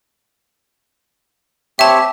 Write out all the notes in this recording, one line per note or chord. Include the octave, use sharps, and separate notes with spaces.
C4 G4 C#5 E5 A5